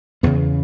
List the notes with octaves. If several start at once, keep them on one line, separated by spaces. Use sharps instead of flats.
E2 C#3 B3